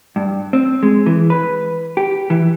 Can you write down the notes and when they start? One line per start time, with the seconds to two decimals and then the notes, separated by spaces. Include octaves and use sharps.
0.16 G2
0.53 C4
0.83 G#3
1.06 E3
1.30 B4
1.97 G4
2.30 E3